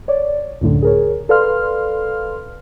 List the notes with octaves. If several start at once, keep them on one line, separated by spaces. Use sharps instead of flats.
C#5 D5
C#2 F#2 A2 D3
G#4 A#4 C#5
A4 B4 D5 F5 C6 F6